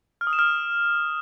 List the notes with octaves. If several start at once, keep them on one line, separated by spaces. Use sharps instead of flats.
F6
D#6
E7
F6